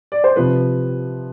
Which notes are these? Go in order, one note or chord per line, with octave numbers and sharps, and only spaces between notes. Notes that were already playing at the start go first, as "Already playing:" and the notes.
D5
C5
C3 F3 B4